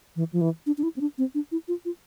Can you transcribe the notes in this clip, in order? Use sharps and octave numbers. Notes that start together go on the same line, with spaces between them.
E3
F3
E3
D4
D4
E4
C4
D4
C4
D4
E4
F4
F4